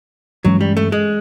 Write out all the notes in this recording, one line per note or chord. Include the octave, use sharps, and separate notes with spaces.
G2 E3 F#3 G#3 C#4
G3
A3
G#3